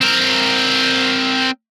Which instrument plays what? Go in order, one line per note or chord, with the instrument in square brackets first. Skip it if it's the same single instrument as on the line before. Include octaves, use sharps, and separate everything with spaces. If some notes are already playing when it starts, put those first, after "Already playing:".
[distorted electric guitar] C4 A#4